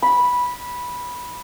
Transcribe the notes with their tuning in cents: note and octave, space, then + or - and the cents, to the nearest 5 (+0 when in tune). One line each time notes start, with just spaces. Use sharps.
B5 -10